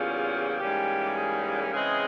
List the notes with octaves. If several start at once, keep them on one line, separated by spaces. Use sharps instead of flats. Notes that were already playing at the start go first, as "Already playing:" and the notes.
Already playing: E2 C#3 G3 A#3 C#4 F4
G#2 E3 G3 A#3 C#4 G4
G#4
C#3 E3 G#3 C4 G#4